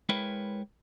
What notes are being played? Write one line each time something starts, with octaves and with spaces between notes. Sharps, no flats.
G#3 E4 A#4 B4 C#5 G5